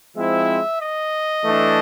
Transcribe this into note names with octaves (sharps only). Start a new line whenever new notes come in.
F3 G#3 C4 E4 E5
D#5
E3 A3 D4